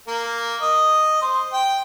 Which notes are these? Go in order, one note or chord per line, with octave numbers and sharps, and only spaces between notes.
A#3
D#5
C5
G5